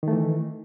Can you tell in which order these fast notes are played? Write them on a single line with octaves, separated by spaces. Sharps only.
D#3 A3 E3